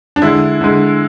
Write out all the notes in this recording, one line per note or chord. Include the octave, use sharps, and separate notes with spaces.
D4
D3 G#3 E4
D3 G#3